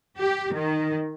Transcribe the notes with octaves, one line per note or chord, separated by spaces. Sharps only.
G4
D#3